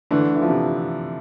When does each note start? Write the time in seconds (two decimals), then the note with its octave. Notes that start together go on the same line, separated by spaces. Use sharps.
0.11 D3 E3 A3 D4
0.35 E3
0.42 F3
0.49 C3